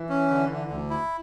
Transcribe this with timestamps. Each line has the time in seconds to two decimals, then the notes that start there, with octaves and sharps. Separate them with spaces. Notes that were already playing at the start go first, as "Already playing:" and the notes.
Already playing: E3
0.09 C#4
0.30 D3
0.50 D3
0.70 D2
0.90 E4